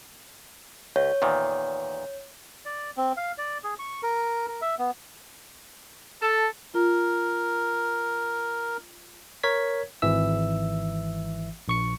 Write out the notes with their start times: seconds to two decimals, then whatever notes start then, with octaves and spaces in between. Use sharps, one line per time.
0.96 C#2 C#5
1.22 E2 A#2 D#3
2.65 D5
2.97 C4
3.17 F5
3.38 D5
3.64 G#4
3.79 C#6
4.03 A#4
4.48 A#4
4.62 E5
4.79 B3
6.21 A4
6.74 F4 A#4
9.43 A#4 C#5 G#6 B6
10.02 G#1 E3 E5 E6
11.68 A#1 C#6 C#7